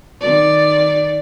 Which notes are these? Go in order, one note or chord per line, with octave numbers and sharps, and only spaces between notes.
D#3 D5